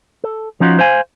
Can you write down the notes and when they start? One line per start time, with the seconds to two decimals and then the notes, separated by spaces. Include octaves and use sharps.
0.24 A4
0.60 F3 C#4 D#4 F4 F#4
0.79 C5 F5 G#5